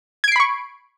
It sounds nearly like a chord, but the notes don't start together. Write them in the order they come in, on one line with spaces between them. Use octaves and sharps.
G#6 D7 C7 B5 C#6